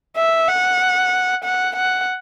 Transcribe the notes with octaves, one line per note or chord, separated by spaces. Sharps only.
E5
F#5
F#5
F#5